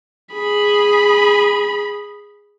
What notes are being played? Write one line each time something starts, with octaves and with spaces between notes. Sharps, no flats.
G#4 B5